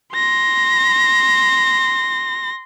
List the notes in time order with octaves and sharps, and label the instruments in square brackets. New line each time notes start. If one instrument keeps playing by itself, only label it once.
[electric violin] C6 A#6